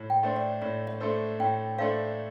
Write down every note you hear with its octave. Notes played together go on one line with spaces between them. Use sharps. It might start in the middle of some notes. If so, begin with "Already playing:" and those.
Already playing: A2
G5
A3 D4 A4 C5
D5
A2 D5
D#5
A3 D4 A4 C5
A2 G5
A3 D4 A4 C5 F5